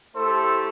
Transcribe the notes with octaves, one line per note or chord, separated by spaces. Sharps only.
A3 E4 G4 A4 C5